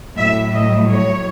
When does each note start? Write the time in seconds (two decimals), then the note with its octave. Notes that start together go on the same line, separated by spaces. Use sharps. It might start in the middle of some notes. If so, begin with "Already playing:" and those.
0.17 A2 F#3 E5
0.53 D#5
0.91 C#5